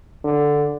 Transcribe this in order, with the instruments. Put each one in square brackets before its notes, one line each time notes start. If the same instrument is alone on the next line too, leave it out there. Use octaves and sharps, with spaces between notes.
[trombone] D3